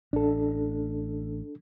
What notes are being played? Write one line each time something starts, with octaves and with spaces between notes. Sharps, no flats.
A1 D4 A4